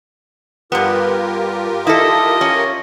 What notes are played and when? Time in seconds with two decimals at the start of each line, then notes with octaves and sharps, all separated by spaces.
0.72 G2 B3 F4 G4 A#4
1.87 E4 A4 D#5
2.41 C#4